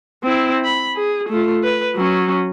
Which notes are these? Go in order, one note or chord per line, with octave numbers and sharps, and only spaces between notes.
C4 E4
B5
G#4
A3 F4
B4
F#3 C#4